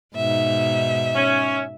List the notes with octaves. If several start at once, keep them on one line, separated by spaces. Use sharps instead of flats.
G#2 B2 D#4 E5
C#4